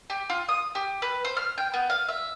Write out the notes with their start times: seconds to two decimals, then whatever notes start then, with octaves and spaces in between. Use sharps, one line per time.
0.10 G4
0.30 F4
0.49 D#6
0.75 G4
1.02 B4
1.25 C5
1.37 F6
1.58 G5
1.74 B3
1.90 F5
2.08 E5